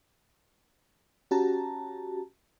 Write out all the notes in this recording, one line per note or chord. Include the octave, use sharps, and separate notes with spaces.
C#4 F#4 G4 A5 A#5